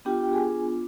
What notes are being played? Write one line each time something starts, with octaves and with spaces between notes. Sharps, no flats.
B3 D4 F4 G4 G5
G5
G#4 G#5